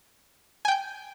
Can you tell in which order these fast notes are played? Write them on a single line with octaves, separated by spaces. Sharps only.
G#5 G5 G6